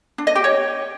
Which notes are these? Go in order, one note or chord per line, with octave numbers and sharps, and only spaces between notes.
D4
D#5
G4
C#5